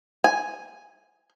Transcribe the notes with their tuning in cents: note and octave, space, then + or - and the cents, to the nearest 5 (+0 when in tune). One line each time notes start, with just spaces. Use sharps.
G#5 +0